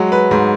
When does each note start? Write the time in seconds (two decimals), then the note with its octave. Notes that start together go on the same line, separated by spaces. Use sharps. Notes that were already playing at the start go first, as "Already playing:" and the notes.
Already playing: F#3 G#3
0.12 B4
0.31 G#2